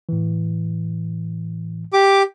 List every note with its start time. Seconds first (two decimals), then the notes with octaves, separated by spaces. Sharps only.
0.09 A2 E3
1.93 G4 D6